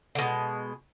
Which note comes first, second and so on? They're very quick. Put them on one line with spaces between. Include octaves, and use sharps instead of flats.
D3 B2 G#3